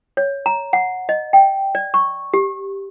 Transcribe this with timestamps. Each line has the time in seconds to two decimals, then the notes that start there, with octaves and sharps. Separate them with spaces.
0.17 C#5
0.46 A#5
0.73 F#5
1.09 D#5
1.33 G5
1.75 D5
1.94 C#6
2.34 G4